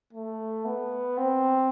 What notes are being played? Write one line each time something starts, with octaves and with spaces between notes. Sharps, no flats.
A3
B3
C4